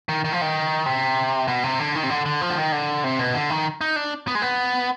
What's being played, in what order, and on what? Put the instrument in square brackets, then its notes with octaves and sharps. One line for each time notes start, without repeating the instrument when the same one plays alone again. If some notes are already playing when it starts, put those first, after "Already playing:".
[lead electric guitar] D#3
D#3
F3
D#3
C3
B2
C3
D3
D#3
C3
D3
D3
F3
D3
D#3
D3
C3
B2
D3
D#3
D#4
D4
B3
G#3
B3